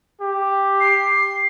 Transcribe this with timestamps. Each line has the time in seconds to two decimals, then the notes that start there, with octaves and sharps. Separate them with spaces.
0.21 G4
0.80 C7